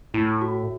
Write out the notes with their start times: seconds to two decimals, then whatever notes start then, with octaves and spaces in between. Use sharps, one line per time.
0.14 A2 E4
0.42 F#4